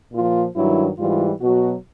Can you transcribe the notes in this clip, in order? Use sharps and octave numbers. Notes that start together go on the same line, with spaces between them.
A#2 F3 F4
G2 D#3 F#3 E4
G#2 E3 G3 F4
B2 F#3 F#4